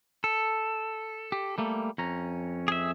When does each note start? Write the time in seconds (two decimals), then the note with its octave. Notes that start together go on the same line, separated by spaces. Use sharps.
0.24 A4
1.32 G4
1.58 G3 A3 A#3
1.98 F2 C#4 A#5
2.68 G#4 E5